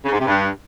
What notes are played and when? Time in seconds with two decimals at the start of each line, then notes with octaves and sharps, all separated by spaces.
0.05 C#3
0.12 G#2
0.19 C3
0.26 G2